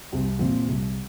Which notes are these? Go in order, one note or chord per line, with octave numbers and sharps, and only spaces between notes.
C2 C4
A#2 F3 C4
C2